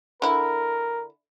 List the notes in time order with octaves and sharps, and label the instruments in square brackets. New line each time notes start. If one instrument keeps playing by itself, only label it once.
[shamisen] D3 E4 [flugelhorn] A#4